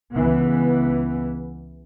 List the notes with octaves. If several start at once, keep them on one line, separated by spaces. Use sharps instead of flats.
C#2 E3 B3